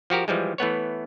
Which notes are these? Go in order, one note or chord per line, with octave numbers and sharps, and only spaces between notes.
F3 F#4 G4 A#4
E3 F3 G3 G#3
E3 A3 B3 C#5